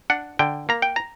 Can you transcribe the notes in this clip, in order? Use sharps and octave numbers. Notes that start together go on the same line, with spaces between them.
D4 F#5
D3 G5
A#3 A#5
G5
A#5